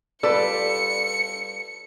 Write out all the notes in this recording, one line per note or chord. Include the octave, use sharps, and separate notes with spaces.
G3 F4 A4 B4 D5 C#7